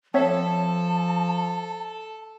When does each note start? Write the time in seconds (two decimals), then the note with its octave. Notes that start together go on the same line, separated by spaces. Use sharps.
0.14 F3 C4 A4 C#5 E5 A5